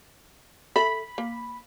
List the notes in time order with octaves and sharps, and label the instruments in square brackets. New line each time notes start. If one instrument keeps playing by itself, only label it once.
[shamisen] A4 E5 [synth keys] B5
[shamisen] A#3